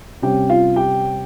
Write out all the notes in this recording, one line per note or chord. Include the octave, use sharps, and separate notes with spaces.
C3 G3 C#4 G4 G5
F4 F5
G4 G5